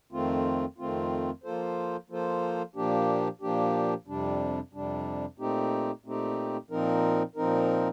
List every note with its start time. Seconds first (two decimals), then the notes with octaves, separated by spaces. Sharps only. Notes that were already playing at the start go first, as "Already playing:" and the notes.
0.12 F2 D#3 A3 C4 F4
0.78 F2 D#3 A3 C4 F4
1.44 F3 A#3 F4 A4 C5
2.10 F3 A#3 F4 A4 C5
2.76 A#2 F3 A#3 D4 G4
3.41 A#2 F3 A#3 D4 G4
4.07 F2 C3 G3 D4
4.73 F2 C3 G3 D4
5.38 A#2 A3 C4 D#4 G4
6.04 A#2 A3 C4 D#4 G4
6.70 A#2 F3 C4 D#4 A#4
7.36 A#2 F3 C4 D#4 A#4